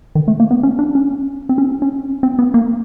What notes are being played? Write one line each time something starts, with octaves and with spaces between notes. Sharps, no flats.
D#3
A3
A#3
B3
C#4
D4
C#4
C4
C#4
C#4
C4
B3
A#3